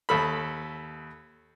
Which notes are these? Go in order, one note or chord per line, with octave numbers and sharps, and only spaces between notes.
D#2 A4 B5